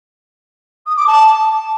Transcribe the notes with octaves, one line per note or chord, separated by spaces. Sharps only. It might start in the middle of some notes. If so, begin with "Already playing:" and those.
D#6
D6
A5